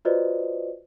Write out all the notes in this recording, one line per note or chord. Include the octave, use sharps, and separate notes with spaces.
F4 F#4 B4 C5 D5 D#5